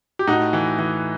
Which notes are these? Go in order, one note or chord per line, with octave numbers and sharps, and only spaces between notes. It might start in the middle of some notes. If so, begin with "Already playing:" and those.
G4
A2 D#4 F#4
E3
E3